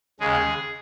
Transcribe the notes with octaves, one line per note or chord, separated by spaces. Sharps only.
D#2 C#3 G#3 G#4